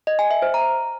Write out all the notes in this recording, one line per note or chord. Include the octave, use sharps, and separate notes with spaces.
D#5
G#5
E5
C5
A#5